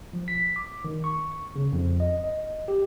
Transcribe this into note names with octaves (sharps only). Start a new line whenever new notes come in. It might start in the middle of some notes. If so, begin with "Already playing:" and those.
F3
B6
D6
D#3
C#6
C#3
F2
D#5
D#5
G4